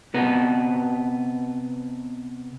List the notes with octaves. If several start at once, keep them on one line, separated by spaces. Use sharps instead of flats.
C3 B3 B4 A#5